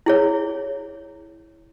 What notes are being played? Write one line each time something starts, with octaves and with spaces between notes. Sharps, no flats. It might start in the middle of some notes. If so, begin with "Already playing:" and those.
E4 G#4 C#5